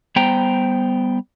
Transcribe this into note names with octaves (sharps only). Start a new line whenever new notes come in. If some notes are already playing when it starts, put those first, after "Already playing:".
G3 B3 C5 G5 A#5